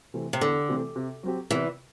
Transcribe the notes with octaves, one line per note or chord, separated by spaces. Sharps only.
C3 E3 A3 C4
C3
E2 D3
C3 E3 A3 C4
C3
F#3 C4 G4
E2 C3 E3